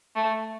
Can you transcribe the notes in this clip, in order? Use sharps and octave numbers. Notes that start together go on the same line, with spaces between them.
A3